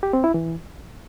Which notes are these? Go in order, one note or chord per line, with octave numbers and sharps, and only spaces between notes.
G4
C4
E4
E3